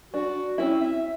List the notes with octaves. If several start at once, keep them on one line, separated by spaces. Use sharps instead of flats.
D4 F#4
C4 C#4 E4
E5